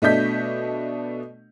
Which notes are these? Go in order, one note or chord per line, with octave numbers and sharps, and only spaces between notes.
B2 A3 D4 D#5 G6 B6